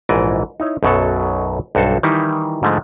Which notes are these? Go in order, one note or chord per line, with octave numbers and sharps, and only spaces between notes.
A#1 G#2 E3 D5 D#5
D#4 E4 C#5
B1 F#2 B2 F#3 A4
B1 G2 F#4 A4 C5
D#3 E3 G3 D#4 E4
G#2 D3 F3 G#3 A3